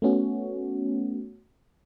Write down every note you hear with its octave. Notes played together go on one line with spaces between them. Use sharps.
A3 B3 C#4 F#4